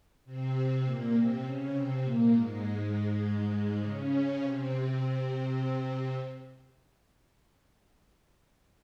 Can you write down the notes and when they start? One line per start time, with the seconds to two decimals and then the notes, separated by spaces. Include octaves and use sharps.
0.25 C3 C4
0.84 A#2 A#3
1.14 C3 C4
1.43 C#3 C#4
1.73 C3 C4
2.03 A#2 A#3
2.32 G#2 G#3
3.81 C#3 C#4
4.40 C3 C4